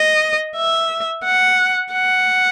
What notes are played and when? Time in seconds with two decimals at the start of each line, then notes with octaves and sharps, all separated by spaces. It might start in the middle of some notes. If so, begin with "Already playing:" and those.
Already playing: D#5
0.56 E5
1.25 F#5
1.93 F#5